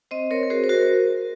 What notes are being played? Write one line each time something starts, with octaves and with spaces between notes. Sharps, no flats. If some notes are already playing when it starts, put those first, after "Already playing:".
C4 C5 D#5
C4 A#4 C#5
A#4
F#4 G#4 C5
C5
F#4 A#4